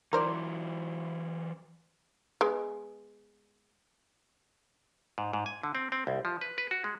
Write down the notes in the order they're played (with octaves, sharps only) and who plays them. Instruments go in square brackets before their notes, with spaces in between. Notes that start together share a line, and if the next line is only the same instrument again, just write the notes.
[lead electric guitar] E3 F#3 [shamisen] A#4 C5 D5
[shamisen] G#3 B3
[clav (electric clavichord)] G#2
G#2
G#5
D3
C4
C4
C2
F3
B4
B4
F#4
G#3